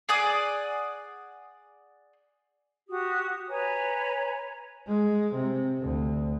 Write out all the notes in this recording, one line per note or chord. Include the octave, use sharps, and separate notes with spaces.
G#4 D5 F#5 D#6
F#4 G4 D#6
B4 C#5 G#5 A#5
G#3
C3
D2